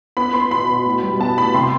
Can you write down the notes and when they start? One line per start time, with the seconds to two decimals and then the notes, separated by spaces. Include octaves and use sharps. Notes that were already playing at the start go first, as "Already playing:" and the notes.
0.17 B3 B5
0.33 B3 C6
0.51 B2 B5
0.68 B2
0.86 A2
1.03 G3
1.19 B3 A5
1.38 A2 B5
1.54 C3 C6